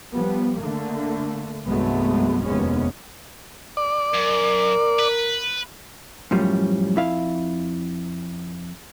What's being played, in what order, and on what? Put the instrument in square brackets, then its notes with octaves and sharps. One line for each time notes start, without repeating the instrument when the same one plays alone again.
[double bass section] F3 G3 B3
D3 A3 A#3
C2 G2 F#3 G#3 A3 B3
F1 D#2 C3 G#3 B3 C#4
[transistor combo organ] D5
[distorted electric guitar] F#2 [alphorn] A#4
[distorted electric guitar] B4
[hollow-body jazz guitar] F#2 A2 F3 G3 C#4
F2 E4 F5